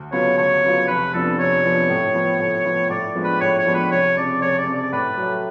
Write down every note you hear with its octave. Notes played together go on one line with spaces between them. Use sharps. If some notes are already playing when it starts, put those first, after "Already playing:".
Already playing: D2
C#3 F#3 B3 F4 C#5
D2 C#5
C#3 F#3 B3 F4
F1 B4
F2 F3 B3 D4 A4
F1 C#5
F2 F3 B3 D4
A2
F3 B3
A2
F3 B3
A2 D5
F3 G#3 B3 D4
B4
A2 C#5
C#5
F3 G#3 B3 D4
B4
F1 C#5
F2 C#3 D5
F1 C#5
D5
F2 C#3
D5
A2 B4
F#3 A3